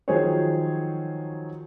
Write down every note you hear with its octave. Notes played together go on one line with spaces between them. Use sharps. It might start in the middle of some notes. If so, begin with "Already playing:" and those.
D#3 F3 F#3 G#4 C5 C#5